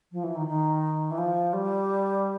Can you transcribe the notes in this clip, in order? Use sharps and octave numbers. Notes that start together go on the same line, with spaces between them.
F3
E3
D#3
D#3
E3
F3
G3